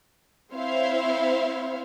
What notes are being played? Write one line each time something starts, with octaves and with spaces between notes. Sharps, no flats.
C4 E4 C5 C#5 E5 F5